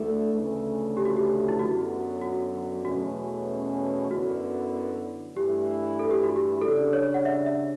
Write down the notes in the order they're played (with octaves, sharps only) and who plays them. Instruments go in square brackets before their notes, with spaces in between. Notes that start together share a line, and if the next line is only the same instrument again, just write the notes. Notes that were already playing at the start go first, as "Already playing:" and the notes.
Already playing: [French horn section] D2 D3 A3 E4 [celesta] A4
[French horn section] D2 C#3 E3 A3 C#4
[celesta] G4
F#4
G4
E4
[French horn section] F#2 D3 F#3 B3 [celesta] F#4
[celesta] F#4
[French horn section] E2 B2 A3 C#4 [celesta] F#4
[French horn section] F#2 D3 F#3 B3 E4 [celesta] F#4
[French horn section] G2 E3 A3 E4 [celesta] G4
[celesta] A4
G4
F#4
G4
[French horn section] C#3 G3 D4 [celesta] A4
[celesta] C#5
F#5
E5
E5